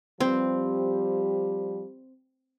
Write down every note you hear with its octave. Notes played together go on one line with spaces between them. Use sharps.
F3 G3 C4 G4